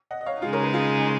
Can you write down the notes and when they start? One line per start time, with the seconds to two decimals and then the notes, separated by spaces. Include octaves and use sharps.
0.11 D#5 F#5
0.21 D#5
0.26 C#5 F5
0.42 C#3 G#3 D#4 F4 G#4
0.53 A#4 C#5
0.63 G#4 B4
0.74 F4 G#4